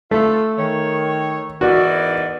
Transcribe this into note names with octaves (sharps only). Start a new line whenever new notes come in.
A3 F4 A4
D#3 C#5
G#2 E3 B3 F#4 A#4 D5